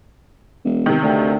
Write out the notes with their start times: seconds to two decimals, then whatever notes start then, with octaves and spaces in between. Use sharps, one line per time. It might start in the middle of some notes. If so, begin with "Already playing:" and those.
0.64 E1
0.86 C3 D#3
1.02 D2